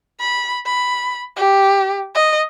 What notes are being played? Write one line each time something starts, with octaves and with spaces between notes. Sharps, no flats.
B5
B5
G4
D#5